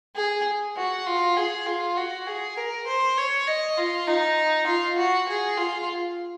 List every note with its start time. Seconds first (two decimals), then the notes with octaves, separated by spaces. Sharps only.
0.16 G#4
0.77 F#4
1.07 F4
1.37 G#4
1.66 F4
1.97 F#4
2.27 G#4
2.57 A#4
2.87 C5
3.18 C#5
3.47 D#5
3.77 F4
4.08 D#4
4.67 F4
4.97 F#4
5.29 G#4
5.57 F4